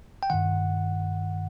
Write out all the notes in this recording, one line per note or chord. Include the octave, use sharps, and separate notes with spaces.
G5
G2 D#3 F#5